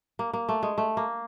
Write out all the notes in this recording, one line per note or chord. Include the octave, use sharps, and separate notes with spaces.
A#3
A#3
A3
G#3
A3
A#3